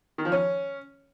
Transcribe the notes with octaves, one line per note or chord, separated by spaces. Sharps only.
D#3
F3
C#4